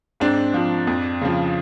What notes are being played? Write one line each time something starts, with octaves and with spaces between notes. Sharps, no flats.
G#2 C4 D4
F3
F2
C#3 F3